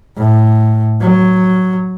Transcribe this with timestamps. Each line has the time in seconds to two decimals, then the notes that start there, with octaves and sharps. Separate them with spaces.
0.17 A2
1.01 F#3